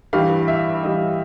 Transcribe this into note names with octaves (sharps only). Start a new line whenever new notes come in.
G2 E3 G3 F5
E5
G2 E3 G3 D#5